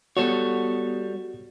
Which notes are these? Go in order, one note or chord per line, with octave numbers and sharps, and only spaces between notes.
G3 B3 F#4 A4 C#5